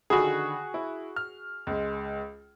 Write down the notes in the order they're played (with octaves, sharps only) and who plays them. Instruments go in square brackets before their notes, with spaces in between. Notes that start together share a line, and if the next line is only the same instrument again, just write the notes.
[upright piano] D3 D#3 B5 [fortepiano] F#4 G#4
[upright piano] E4
F6
C#2 G#3